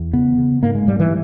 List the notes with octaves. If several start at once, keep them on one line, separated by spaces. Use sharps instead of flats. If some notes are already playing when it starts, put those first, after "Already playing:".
Already playing: E2
C#3 B3
C#3
G#2 A#3
G#3
G#2 G3
E3